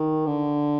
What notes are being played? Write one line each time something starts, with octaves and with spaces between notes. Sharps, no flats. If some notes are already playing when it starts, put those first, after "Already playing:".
Already playing: D#3
D3